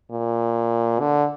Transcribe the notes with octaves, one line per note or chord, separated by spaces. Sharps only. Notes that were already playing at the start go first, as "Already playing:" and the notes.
A#2
D3